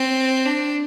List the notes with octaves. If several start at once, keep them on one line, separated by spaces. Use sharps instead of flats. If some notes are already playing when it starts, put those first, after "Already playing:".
Already playing: C4
D4